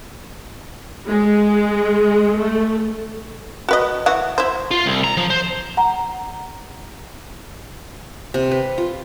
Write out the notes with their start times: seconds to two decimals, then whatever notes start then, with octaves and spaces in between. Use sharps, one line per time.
1.06 G#3
2.35 A3
3.69 F#4 B4 D#5
4.06 E3 F#4
4.38 E4 C5
4.71 F4
4.86 C2
5.04 A#5
5.17 F3
5.30 C5
5.77 F#5 A#5
8.34 C3
8.51 B4
8.78 F4